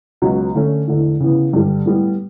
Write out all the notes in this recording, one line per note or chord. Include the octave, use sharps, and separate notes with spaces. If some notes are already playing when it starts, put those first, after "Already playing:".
C#2 B2 F#3
D3 A3 C#4
E2 D3 A3
C#3 E3 B3
G2 D3 G3
A2 G3 B3